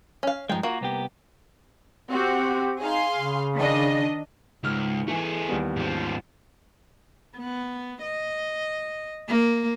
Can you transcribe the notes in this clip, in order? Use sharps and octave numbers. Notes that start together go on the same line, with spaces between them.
C#4 F5
G2 F3 G#3 D#4 G5
A#3 F4 F#4
C2 B3 G4
C4 F#4 G4
D#4 G#4 F5 C6
C#3
D#3 D4 D#5
C#2 G#2 F6
E3 A3 G#4
D#2 G3 B3
G#2 F3
B3
D#5
A#3